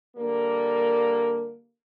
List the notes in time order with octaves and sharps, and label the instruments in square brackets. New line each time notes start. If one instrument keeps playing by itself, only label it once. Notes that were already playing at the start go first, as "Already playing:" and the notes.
[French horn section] D3 G3 A#3